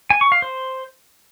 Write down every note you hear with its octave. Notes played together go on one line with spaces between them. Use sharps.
G#5
C#6
F5
C5